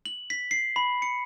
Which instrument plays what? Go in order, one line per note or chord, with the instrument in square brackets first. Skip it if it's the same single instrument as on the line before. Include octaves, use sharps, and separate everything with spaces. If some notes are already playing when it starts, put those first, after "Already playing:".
[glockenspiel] F#7
B6
C7
B5
C#7